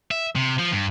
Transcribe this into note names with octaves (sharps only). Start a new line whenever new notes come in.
E5
C3
F3
G2